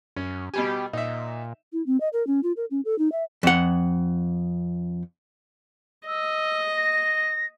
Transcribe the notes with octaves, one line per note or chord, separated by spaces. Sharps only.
F#2 C#4
B2 G3 G4 G#5
A#2 D#4 E5
E4
C4
D#5
A#4
C#4
F4
A#4
C#4
A4
D#4
E5
F2 F#5
D#5 E6
A#6